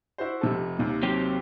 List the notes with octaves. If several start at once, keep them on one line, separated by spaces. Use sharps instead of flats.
E4 F#4 C5
F1 C3 A4
D#2 C3
F#3 C4 G4